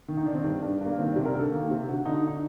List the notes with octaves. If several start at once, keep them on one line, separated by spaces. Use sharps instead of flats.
D#3
D#4
D#3 D4
C4
G2 D4
G2
G2 A#3
D#3 C4
C3 D4
A#4
D2 A4
D#3 A#3
C3 C4
D2 F#4
D3 D#4
D#4